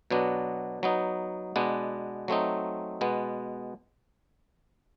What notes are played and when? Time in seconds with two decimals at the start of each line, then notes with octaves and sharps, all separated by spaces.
0.11 B2 F#3 B3 D4
0.83 F#3 B3 D#4
1.56 B2 G#3 B3 D4
2.28 F#3 A3 C4 D#4
3.01 B2 G#3 B3